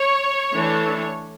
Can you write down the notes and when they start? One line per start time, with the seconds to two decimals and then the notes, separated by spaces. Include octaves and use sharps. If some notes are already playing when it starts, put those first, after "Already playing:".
Already playing: C#5
0.53 E3 A3 D4